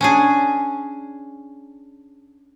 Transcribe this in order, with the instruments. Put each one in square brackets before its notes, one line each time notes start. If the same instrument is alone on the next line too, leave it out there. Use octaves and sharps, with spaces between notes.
[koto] C#4 D4 G#4